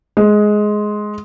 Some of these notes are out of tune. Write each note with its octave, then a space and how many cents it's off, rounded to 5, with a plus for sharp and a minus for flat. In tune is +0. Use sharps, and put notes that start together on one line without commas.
G#3 +10